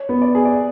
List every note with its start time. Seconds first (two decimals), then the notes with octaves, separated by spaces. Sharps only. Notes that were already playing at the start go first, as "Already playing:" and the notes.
Already playing: C#5
0.09 B3
0.22 D5
0.35 G#4
0.45 D5